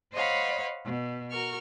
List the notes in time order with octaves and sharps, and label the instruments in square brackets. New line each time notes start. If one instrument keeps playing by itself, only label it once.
[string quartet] C5 C#5 D#5 F5 F#5 B5
B2
F#4 A#4 C#6 F6